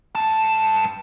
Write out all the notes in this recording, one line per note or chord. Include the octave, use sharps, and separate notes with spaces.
G2 A5